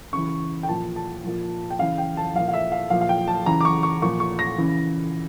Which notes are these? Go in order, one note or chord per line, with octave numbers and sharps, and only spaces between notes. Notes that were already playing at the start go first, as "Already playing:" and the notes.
C#3 E3 C#6
G5
A#2 F3 A5
A5
A#2 F3
G5
C#3 E3 F5
G5
A5
A#2 F3 F5
F5
E5
F5
A#2 F3 F5
F5
G5
A5
C#3 E3 A#5
D6
C#6
C#6
A#2 F3 C#6
C#6
A#6
C#3 E3